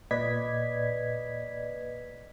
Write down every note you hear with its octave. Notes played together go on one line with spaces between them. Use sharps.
A#2 B4 D5 D#5 G#6 B6